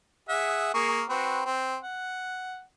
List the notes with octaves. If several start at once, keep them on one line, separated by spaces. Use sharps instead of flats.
G#4 E5 F#5
A#3 G#4 C#6
C4 F#4 B4
C4
F#5